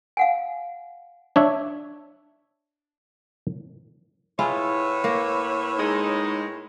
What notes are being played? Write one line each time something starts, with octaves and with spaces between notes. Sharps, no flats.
F5 F#5 G#5
D4 C#5 E5
A2 E4 F4 G#4 B4 C#5
A#3
G#3 D#4